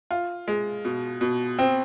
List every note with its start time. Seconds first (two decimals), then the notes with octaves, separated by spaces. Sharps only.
0.11 F4
0.48 G#3
0.85 B2
1.21 B2
1.59 C4